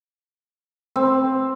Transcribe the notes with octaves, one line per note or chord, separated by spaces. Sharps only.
C4